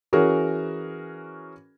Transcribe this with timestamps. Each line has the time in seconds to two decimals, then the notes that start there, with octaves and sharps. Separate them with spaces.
0.13 E3 C#4 F#4 G#4 A#4